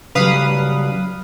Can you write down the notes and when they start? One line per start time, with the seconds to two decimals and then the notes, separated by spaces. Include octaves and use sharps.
0.15 C#3 F#3 G3 B4 F5 D#6